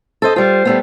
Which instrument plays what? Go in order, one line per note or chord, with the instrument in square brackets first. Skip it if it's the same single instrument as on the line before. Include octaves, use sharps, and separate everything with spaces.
[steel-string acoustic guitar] A4 C5 D#5
[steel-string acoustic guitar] G3 F4 [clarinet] C5
[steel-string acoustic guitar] G3 A3 B3